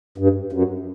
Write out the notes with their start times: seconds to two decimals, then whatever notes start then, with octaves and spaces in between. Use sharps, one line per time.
0.18 G2
0.53 F#2